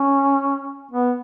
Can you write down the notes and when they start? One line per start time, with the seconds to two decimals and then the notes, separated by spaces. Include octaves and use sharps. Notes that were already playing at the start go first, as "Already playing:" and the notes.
Already playing: C#4
0.91 B3